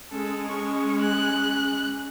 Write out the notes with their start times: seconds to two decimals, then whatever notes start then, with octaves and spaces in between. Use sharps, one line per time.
0.11 G#3 C#4 A4
0.47 C#4 C#6
1.02 F#6